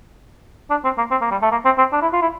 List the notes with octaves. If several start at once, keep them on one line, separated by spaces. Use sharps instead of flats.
D4
C4
A#3
C4
A#3
G3
A3
A#3
C4
C4
D4
E4
F4
E4